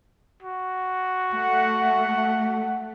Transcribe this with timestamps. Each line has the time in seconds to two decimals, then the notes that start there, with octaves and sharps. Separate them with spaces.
0.43 F#4
1.33 A3 F#5